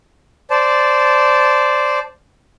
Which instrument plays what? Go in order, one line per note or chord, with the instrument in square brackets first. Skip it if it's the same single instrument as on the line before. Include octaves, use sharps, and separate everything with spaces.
[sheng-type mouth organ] C5 D5 A5